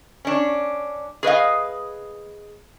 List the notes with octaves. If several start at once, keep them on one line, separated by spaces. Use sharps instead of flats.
C#4 D4
G#4 B4 D#5 F5